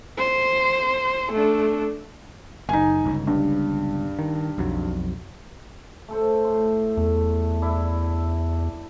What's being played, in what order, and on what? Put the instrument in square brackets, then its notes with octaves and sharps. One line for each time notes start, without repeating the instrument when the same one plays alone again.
[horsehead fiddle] C5
A3 D4
[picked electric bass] F#1 [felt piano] D#4 G#5
[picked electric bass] G1 C#2
[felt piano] G2
[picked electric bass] D#3
B1 F2 F#3
[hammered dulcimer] A3 A4 C5
A2 C6
[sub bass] E2 [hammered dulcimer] A3
[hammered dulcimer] D4 E4 E5